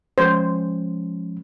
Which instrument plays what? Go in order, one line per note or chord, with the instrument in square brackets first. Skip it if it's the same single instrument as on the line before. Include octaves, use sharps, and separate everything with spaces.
[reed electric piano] F3 G#3 C#4 [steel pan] C5